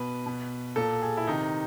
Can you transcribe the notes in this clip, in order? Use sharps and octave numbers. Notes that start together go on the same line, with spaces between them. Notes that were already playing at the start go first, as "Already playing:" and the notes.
Already playing: B2 B4
B2
A#2 A4
G#4
E4
C3 D#3 D#4